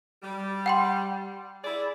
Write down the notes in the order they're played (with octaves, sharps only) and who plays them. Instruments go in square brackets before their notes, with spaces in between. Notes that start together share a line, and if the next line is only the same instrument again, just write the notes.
[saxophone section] G3
[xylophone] F#5 G5 C6
[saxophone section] E4 G#4 D5